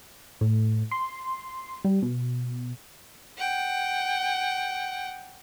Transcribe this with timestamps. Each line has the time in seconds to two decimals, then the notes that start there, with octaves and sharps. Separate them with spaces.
0.41 A2
0.91 C6
1.85 G3
2.02 B2
3.37 F#5 G5